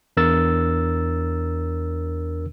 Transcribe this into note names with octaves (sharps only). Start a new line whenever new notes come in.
E2 D4 A#4 E6 A6